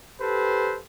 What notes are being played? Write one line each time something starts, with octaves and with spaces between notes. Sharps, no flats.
G4 A4 B4 C5